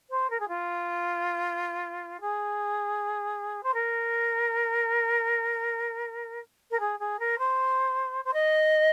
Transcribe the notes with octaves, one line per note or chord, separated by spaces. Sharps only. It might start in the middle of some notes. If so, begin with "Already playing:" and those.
C5
A#4
G#4
F4
G#4
C5
A#4
A#4
G#4
G#4
A#4
C5
C5
D#5